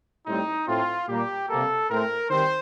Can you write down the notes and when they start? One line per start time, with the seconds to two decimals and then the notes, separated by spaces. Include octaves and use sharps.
0.26 A2 G3 C4 D#4
0.67 A2 A3 C4 F4
1.08 A#2 G3 A#3 G4
1.48 C3 G3 A#3 A4
1.89 A2 A3 C4 A#4
2.30 D#3 G3 C4 C5